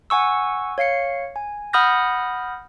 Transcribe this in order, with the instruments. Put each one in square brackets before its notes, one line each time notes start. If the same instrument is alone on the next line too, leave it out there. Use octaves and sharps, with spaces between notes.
[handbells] F#5 G#5 C#6 E6
C#5 F5 C7 C#7
G#5
F#5 B5 D#6 F6 G6 A#6